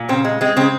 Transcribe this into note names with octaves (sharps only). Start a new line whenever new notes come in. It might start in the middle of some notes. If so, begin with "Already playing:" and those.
Already playing: A#2
C#3 C4
G#3
G#3 C4
C#3 C4